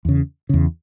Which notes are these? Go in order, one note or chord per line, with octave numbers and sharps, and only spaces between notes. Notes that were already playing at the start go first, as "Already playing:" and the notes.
E2 C#3
E2 C#3